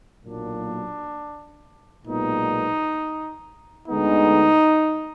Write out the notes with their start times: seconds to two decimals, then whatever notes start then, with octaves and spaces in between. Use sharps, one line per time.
0.23 B1 A#2 F#3 A#3 D4
2.05 B1 A#2 G#3 B3 D#4
3.88 D2 D3 G#3 B3 D#4